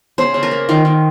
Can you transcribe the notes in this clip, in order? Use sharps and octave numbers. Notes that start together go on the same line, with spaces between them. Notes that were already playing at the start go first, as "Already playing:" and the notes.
C#3 C5
C#3
A#4
A#3
D#3 F4
D#3